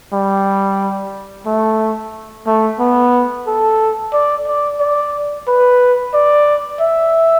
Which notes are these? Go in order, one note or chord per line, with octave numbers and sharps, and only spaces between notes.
G3
A3
A3
B3
A4
D5
D5
D5
B4
D5
E5